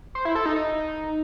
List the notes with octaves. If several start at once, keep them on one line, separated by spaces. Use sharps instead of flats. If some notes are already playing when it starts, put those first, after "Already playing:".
C5
E4
A4
D#4
D#4